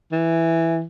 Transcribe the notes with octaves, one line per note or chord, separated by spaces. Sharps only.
E3